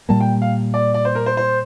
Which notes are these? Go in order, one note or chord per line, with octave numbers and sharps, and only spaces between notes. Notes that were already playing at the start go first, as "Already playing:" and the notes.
A#2 G3 A#3 A5
G5
F5
D5
D5
C5
A#4
C5
C5